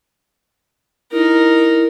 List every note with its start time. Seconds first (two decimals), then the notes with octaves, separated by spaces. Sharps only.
1.12 D#4 E4 A#4